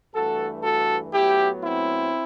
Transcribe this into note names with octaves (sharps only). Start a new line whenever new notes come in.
G2 E3 A3 F#4 A4
F#4 A4
A2 F#3 B3 E4 G4
C4 E4